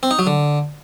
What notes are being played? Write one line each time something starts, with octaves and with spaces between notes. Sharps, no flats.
C4
D#4
F#3
D3